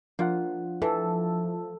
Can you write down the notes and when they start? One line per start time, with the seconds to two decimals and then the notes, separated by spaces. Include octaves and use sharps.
0.19 F3 A#3 D4 F4 F#5
0.82 E3 A4